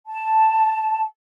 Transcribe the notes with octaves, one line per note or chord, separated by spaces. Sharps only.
A5